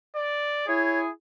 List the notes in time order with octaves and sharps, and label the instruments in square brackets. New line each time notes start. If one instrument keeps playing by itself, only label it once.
[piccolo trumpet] D5
[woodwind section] E4 G#4 [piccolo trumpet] C#5